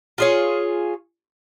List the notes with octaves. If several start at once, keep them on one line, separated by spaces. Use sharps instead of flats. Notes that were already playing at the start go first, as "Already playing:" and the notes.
F4 G#4 C#5